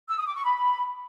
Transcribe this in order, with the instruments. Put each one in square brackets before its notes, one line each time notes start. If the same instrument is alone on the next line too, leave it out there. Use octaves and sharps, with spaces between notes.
[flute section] E6
D#6
D6
C#6
B5